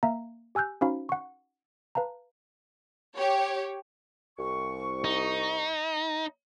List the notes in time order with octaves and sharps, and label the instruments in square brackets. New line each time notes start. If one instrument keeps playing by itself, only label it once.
[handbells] A#3 E5 F5 A#5
G4 G#5 E6 F#6 G6
C#4 D#4 F#4 C5 F5 B5
F#5 C#6
B4 F5 A5 A#5
[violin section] G4 C#5
[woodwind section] C2 C#6
[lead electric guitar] D#4